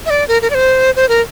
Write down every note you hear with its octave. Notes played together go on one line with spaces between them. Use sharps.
E5
D5
A#4
A#4
D5
C5
C5
A#4